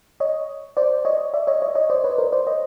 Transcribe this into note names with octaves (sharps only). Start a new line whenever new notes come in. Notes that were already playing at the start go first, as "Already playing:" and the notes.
C#5 D#5
C5 D5
C#5 D#5
D5 E5
C#5 D#5
C#5 D#5
C#5 D#5
C5 D5
B4 C#5
A#4 C5
C5 D5
C#5 D#5